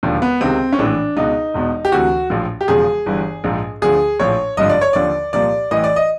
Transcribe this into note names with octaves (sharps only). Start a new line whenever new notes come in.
E1 D#2 D3 F3
B3
C#2 C3 D#3 C4
C#4
A#1 A2 E3 D4
C#2 B2 D#4
E1 E2 B2
G4
D2 C3 E3 F#4
A#1 A2 F3
G4
E1 E2 C#3 F3 G#4
G1 G2 E3
A#1 G#2 F3
D2 D3 F3 G#4
A#1 A2 F3 C#5
G#1 G2 D3 F3 D#5
D5
C#5
D#2 D3 F3 D5
C2 A#2 F3 D5
A1 A2 E3 D#5
D5
D#5